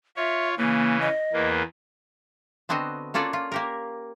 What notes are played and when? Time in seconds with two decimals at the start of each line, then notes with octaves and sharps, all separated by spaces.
0.17 F4 C#5 E5
0.57 C#3 E3 A#3
1.01 D#5
1.33 E2 E3 A#3
2.69 D3 B3 C4 F#4 D#5
3.14 A#3 C#4 F4 A4 D5 F#5
3.33 F4
3.52 A#3 G4 A#4